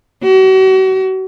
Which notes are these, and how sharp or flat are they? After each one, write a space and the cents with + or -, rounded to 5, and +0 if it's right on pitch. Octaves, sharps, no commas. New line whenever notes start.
F#4 +40